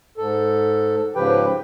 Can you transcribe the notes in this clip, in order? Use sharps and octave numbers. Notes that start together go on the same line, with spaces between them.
G#2 A4
G#2 C#3 F3 G4 B4 G5